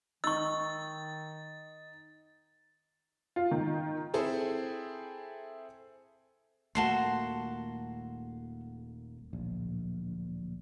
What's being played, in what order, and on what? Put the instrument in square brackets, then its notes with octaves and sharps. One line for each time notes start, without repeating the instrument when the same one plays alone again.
[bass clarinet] D#3 [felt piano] D#4 [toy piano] C#6 E6 [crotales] A6
[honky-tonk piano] F4
D#3
C4 E4 G#4 A4 C5
[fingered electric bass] D#1 A3 A#3 [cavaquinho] F#4 A5 C6
[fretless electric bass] D1 A#1